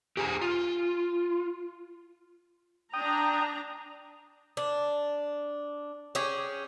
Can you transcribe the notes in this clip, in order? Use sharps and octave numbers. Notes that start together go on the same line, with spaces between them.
G4 G#4 G#5 A#5
F4
D4 G5 A#5 D#6
D4
C#4 G4 G#4